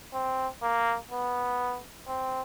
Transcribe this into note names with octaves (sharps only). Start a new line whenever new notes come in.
C4
A#3
B3
C4